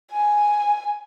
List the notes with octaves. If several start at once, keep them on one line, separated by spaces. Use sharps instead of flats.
G#5